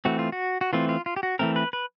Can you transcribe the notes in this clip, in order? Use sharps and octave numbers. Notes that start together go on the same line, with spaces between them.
E3 A3 C4 F#4
F4
F#4
F#4
E3 A3 C4 F4
F4
F4
G4
F#4
E3 A3 C4 A#4
B4
B4